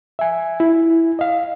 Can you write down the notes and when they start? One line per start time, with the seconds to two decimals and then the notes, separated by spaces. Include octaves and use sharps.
0.19 E5 G#5
0.60 E4
1.19 D#5 F5